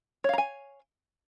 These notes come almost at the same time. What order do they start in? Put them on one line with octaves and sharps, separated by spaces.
C#5 F5 A#5 G#5